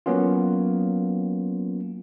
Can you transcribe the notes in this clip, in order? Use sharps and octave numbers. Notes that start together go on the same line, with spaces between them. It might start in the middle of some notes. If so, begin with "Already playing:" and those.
F#3 A#3 B3 C#4 F4